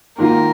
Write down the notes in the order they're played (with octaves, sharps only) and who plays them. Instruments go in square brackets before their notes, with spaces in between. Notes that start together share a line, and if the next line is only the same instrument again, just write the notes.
[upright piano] G#2 D#3 A#3 F4 [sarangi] A#4